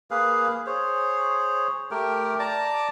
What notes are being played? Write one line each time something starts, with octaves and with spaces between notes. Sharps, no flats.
A#3 G#4 B4 F5
G#4 C5 C#5
A3 G4 A#4 G5
D5 A5 A#5 D6